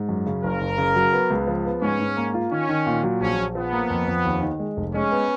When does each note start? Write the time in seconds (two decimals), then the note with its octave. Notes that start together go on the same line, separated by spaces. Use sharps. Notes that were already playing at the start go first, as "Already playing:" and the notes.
Already playing: G#2
0.09 F#2
0.26 C#3
0.44 F#1 A#4
0.61 F#1
0.78 C#3
0.96 F#3
1.13 B3
1.30 C#2
1.48 F3
1.65 B3
1.82 G#2 C#4
2.00 G#2
2.17 A#3
2.34 F4
2.52 D#3 C#4
2.69 D#3
2.87 A#2
3.03 F#3
3.20 A#1 C#4
3.38 A#1
3.55 F3 B3
3.73 A#3
3.90 F2
4.07 F2
4.25 D#2
4.42 D#3
4.60 G#3
4.77 F1
4.94 G#3 C#4
5.12 B3